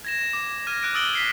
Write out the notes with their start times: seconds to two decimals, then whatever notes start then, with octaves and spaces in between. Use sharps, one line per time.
0.05 G#6 A#6 E7
0.33 D6
0.67 F6 G#6 A#6 D#7
0.82 D6 F#6 D7 D#7
0.94 D#6 E6 A6 D7 F#7 G7
1.13 B6 C7 G7